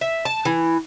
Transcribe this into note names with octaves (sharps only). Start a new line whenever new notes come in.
E5
A5
E3